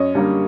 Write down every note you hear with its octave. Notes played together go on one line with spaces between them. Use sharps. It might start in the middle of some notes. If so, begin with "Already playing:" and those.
Already playing: F#2 C#5 D#5
D3 G3 A#3